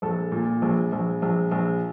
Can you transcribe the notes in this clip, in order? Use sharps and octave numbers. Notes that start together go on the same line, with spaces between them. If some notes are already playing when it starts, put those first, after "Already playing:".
A#1 A4
A#2
A#1
A#1
A#1
A#1